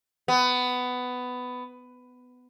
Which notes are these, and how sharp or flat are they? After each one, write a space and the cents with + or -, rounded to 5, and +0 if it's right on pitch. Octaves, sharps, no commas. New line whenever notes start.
B3 +15